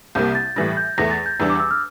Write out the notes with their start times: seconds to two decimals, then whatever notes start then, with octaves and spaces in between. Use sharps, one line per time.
0.15 C2 C3 G3 A#3 G6
0.35 A6
0.56 A2 E3 G3 A#6
0.77 G6
0.98 E2 E3 A3 A#6
1.11 A6
1.26 G6
1.40 E2 E3 G3 D4 E6
1.50 D6
1.60 E6
1.71 F6